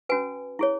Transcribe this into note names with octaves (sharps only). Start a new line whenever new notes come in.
C#4 F#4 B4 G#5
E4 G#4 C#5